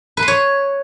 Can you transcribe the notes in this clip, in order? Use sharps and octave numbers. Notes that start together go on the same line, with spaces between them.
B4
C6
C#5